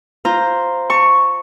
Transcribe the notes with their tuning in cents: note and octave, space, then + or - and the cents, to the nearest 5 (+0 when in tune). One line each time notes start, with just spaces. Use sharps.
F4 +0 C5 +0 A#5 +0
A5 +40 C#6 +0